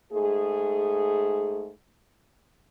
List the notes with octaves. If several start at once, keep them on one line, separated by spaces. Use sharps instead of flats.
G#2 A3 G#4